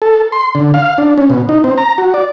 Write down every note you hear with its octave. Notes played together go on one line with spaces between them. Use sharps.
A4
C6
D3
F5
D4
C#4
B2
D#4
C4
A#5
F#4
D5